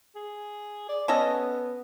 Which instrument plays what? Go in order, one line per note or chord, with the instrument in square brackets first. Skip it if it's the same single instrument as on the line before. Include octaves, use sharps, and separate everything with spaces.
[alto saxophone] G#4
D5
[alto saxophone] B3 [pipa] C#4 A4 D#5